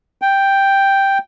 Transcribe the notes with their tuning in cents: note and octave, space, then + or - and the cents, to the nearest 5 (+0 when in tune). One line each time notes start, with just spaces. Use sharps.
G5 +0